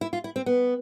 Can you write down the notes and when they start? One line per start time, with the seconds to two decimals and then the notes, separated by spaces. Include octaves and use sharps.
0.01 E4
0.13 F4
0.24 E4
0.36 C4
0.46 B3